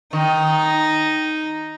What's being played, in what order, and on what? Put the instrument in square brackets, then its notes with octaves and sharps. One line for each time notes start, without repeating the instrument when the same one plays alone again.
[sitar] D#3 [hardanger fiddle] D#4